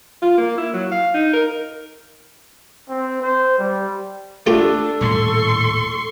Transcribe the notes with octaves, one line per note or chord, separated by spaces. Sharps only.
F4
A#3
E4
F#3
F5
D#4
A#4
C4
C5
G3
A3 D4 F4 G4 A4
D#1 A2 G3 C6 C#6